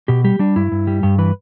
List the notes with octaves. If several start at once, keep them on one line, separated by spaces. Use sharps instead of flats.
B2 G4
G3 G4
G3 D4
G2 E4
G2
G3
G2 G4
E3 B4